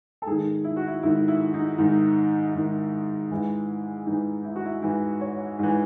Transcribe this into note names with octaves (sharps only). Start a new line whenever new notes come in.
A4
G#2 D#3 G#4
E4
F#4
E4
G#2 D#3 E4
E4
D#4
G#2 D#3
G#2 D#3
G#2 E3 E4
G#2 E3 D#4
E4
F#4
E4
G#2 E3 E4
C#5
G#2 E3